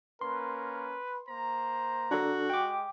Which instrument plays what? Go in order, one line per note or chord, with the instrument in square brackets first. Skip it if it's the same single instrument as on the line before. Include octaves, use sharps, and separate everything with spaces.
[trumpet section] A#3 C#4 A#4 [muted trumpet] B4 [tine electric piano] C6
[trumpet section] A#3 A#5 [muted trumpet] C5
[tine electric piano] D4 A4 [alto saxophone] F#4
[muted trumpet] G#3 [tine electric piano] G5 D6